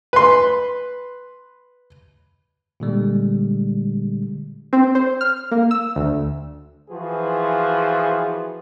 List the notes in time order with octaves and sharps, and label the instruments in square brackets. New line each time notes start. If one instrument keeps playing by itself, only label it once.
[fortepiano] B4 C6
[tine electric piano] A#2 D3 G3 G#3
[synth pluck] C4
C5
F6
A#3
E6
D2
[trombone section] E3 F3 F4 F#4 G#4 B4